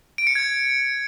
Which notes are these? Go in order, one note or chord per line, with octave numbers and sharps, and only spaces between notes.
D7
C#7
G#6